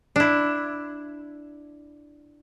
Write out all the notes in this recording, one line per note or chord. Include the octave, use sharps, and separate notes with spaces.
D4 E4